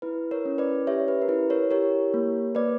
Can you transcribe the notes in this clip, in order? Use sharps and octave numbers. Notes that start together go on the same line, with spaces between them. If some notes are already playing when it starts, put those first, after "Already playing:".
E4 B4
A#4 C#5
C#4
B4 D5
G4 C#5 E5
B4
A#4
E4 B4
A#4 C#5
G4 A#4 C#5
A#3
A#3 B4 D5